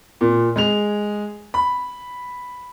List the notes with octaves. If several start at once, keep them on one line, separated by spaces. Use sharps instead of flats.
A#2
G#3 G#4 F7
B5